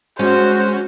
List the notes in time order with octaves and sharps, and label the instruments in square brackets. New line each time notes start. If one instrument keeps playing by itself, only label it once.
[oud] G#3 [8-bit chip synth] C#4 [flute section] F#4 [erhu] C5